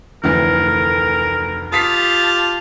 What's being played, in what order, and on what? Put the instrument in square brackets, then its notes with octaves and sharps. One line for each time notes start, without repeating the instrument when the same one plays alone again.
[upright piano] F1 D2 E3 [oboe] A#4
[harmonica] F4 G4 A5 [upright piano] D#6 B6 C7